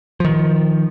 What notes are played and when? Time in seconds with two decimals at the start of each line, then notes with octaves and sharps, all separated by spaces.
0.20 D#3 F3